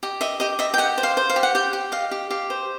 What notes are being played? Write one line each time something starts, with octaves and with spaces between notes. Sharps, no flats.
G4 D#5
D#5 E5
G4 D#5
D#5 E5
G5
G4 F#5
C5
F5
C5
F5
G4
F#5
G4 G5
G4
D#5 F5
G4
G4 F5
C5